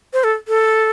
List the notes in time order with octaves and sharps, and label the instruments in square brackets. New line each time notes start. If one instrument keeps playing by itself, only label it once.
[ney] C5
A4
A4